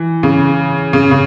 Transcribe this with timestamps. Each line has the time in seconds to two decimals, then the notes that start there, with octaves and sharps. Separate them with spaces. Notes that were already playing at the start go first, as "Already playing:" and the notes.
Already playing: E3
0.23 C#3
0.93 C#3
1.11 C#3